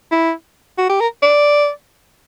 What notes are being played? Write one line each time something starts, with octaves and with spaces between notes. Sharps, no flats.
E4
F#4
G4
A#4
D5